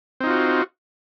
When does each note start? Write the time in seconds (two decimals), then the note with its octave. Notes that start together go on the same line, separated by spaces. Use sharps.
0.21 C4
0.24 D#4
0.27 F4
0.30 F#4